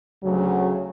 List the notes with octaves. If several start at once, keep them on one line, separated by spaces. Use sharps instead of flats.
D2 C#3 F#3